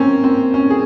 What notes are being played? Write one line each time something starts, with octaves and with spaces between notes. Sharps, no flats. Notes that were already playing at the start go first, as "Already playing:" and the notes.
Already playing: A#3 C4 C#4
C4
C#4
G#4